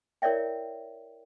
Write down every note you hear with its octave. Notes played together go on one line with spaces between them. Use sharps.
E4 A#4 C#5 D5 E5 G5